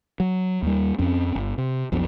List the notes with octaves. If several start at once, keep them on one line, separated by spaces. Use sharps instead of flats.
F#3
D#2 G3
F2 C4 C#4
G1
C3
B1 F2 B2